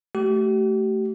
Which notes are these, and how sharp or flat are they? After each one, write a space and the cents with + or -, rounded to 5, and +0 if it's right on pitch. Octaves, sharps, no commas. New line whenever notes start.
A3 +0 G4 -40